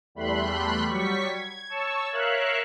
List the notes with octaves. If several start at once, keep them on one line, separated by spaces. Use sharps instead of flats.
E2 G3 A3 B5 C6 F#6
F#3 G3 C#6 B6
G#6
C#5 A5 C#6 E6
A#4 C#5 E5 F5 F#6